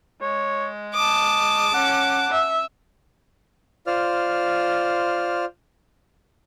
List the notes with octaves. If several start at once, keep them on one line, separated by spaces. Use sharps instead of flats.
G#3 C#5
A5 D6 D#6
C#4 F#5
E5
F4 C5 D5 F6